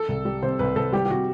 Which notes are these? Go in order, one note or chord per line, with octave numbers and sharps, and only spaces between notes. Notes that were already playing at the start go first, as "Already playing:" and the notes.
Already playing: A4
C2
G3
C3 C5
C2 B4
C2 A4
G3 G4
G4
C3 F#4